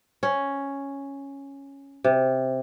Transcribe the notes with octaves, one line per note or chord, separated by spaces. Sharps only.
C#4
C3